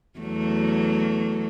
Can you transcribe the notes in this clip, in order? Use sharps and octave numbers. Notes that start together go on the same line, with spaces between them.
E2 F#3 A3